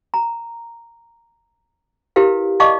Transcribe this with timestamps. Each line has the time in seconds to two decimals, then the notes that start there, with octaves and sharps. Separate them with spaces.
0.14 A#5
2.16 E4 G4 A#4 B4 F5
2.60 D5 D#5 F5 A5 C#6 D6